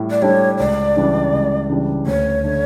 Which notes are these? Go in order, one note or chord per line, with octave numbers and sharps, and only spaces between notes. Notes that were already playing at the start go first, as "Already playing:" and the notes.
Already playing: A2 G3
D5
G3 D4 A4 C#5
C#2 D5
C#3 E3 G3 D4
C#2
C#3 E3 G3 D4
D2 C#5
D3 A3 D4